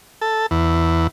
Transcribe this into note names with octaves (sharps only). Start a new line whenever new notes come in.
A4
E2